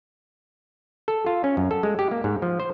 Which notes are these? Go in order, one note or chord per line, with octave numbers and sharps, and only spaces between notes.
A4
F4
C#4
F#2
A4
G#3
G4
A#3
G#2
F3
C5